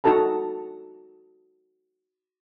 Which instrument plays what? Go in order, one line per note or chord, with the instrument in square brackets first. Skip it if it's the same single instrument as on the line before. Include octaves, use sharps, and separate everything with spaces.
[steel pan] D#4 F#4 A4 A5 A#5